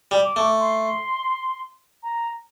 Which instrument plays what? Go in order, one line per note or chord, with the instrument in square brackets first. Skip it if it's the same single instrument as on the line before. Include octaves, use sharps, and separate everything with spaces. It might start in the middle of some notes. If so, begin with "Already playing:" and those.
[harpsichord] G3
[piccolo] D6
[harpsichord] A3
[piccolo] C6
A#5